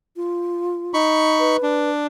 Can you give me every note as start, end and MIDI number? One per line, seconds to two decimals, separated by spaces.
0.16 0.94 65
0.94 1.57 63
0.94 1.57 83
0.94 1.57 85
1.40 1.91 71
1.63 2.07 62